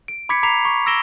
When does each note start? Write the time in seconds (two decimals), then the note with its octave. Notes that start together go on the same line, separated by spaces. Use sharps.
0.08 D7
0.29 B5 D6 G#6 B6 C#7
0.43 A#5 B5 D6 B6 C7 F7
0.65 C#6
0.86 E6 A#6 D7 E7 G7